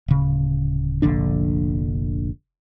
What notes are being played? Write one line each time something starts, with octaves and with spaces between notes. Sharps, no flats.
D1 C#3
F1 A#1 D3 D4